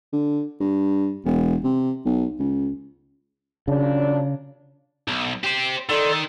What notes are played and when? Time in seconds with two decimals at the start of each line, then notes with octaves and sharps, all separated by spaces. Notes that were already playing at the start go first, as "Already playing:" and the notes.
0.13 D3
0.61 G2
1.25 E1
1.64 C3
2.05 B1
2.39 C#2
3.68 A#2 C#3 F#3 D4
5.08 B1
5.44 G4 C5
5.89 D#3 D#4 A4 D5 C6